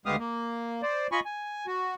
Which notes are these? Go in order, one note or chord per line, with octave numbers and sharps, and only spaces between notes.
D2 G#3 B3 G4 F5 D#6
A#3
C5 D5
F4 D#5 G#5 B5 C#6
G#5
F#4